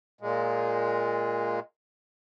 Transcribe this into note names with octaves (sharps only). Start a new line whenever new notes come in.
A#2 G#3